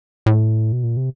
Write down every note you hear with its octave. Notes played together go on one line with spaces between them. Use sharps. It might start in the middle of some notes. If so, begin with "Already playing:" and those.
A2
B2
A#2
C3